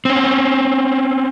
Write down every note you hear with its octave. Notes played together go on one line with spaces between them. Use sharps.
C4 C#4